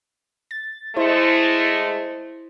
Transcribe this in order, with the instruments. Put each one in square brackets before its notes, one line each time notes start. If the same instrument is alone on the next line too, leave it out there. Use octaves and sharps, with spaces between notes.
[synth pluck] A6
[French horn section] G#3 A3 [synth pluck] E4 C5